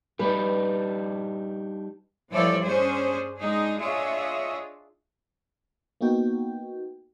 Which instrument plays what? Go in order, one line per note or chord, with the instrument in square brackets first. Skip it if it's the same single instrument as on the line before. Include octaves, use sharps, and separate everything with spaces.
[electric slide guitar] G3 D4 D#4 [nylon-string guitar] B4
[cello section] G2 E3 F3 A4 C#5 D5
C#4 D4 G#4 C5
G#3 D4 D#4 G#4
D4 F4 G#4 C#5 D#5 E5
[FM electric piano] A#3 B3 D#4 F#4 G5